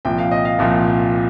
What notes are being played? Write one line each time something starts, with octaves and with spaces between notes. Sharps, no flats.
C2 A#2 F3 G5
F5
D#5
F5
C2 A#2 F3